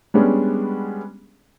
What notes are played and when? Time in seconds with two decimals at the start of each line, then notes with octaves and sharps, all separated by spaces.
0.14 G3 G#3 B3 C#4 D4 G#4